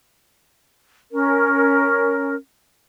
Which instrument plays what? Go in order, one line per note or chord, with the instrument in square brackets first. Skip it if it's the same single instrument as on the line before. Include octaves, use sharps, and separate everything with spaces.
[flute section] C#4 A#4